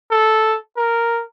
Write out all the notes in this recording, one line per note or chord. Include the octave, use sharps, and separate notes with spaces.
A4
A#4